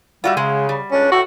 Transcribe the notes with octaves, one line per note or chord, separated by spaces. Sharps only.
G3 F4 F#4 E5
C#3 G#3
G3
C#2 C#4 D4
D2 A2 F#4 A4